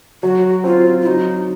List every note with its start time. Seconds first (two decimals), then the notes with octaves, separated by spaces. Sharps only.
0.23 F#3 F#4
0.64 C4 F4
1.01 F4
1.06 F#3 D#4